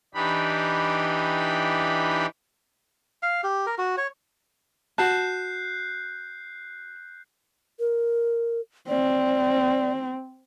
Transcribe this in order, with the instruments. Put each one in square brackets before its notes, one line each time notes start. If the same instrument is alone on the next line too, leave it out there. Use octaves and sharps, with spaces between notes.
[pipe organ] E3 D4 D#4 G4 B5
[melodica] F5
G4
A#4
F#4
C#5
[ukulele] F#4 A5 [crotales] F#6 G6 C7
[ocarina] A#4
[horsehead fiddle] C4 [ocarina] D5